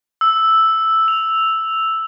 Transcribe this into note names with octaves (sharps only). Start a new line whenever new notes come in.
E6
F7